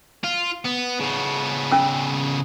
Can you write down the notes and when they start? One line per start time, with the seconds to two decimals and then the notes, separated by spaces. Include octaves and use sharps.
0.24 F4
0.65 B3
1.00 C#3 B3
1.72 C#4 E6